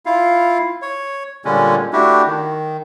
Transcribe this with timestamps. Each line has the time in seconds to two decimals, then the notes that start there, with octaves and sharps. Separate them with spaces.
0.06 E4 F4 F5
0.82 C#5
1.45 A#2 D3 G3 G#3 C#4
1.93 A3 D4 E4 F#4 G4
2.26 D#3